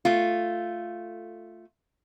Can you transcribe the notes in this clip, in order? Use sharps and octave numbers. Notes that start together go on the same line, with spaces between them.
A3 F4